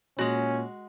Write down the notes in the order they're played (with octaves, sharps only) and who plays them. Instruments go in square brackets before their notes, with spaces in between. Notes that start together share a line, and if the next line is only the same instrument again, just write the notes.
[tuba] A#2 [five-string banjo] G#3 F#4 [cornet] C#4